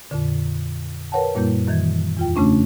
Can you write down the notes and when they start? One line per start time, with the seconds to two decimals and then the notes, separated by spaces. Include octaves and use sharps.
0.11 F2 A#2 D3
1.12 A#4 B4 C#5 F#5 G5 A5
1.35 F#2 A#2 G3 A#3 E4 G6
1.67 F#2 D#3 E3 G#6
2.17 E2 F4 G5
2.36 C#3 A3 C#4 D4